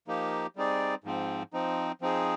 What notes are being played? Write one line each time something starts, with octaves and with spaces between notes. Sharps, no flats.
F3 A#3 D#4 G4
G3 C4 D#4 G#4 D5
G#2 F3 C4
F3 C4 D#4
F3 C4 D#4 G#4